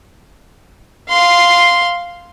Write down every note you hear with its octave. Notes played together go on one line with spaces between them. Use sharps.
F5 C6